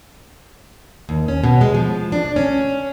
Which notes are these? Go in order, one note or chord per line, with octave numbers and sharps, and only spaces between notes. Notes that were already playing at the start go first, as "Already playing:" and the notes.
D#2
C#4
B2
G#3
F3
D4
C#4